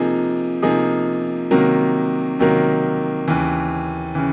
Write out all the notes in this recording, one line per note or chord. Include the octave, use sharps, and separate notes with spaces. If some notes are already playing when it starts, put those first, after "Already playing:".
Already playing: C3 F3 A#3 D#4 G#4
C3 F3 A#3 D#4 G#4
C3 D#3 F#3 A#3
C3 D#3 F#3 A#3
D#2 C#3 E3
C#3 E3